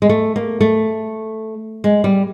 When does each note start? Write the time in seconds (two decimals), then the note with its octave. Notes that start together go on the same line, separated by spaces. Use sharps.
0.02 G#3
0.09 A3
0.36 A#3
0.61 A3
1.84 G#3
2.04 G3